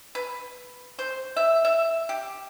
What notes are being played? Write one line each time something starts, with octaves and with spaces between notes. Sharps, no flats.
B4
C5
E5
E5
G4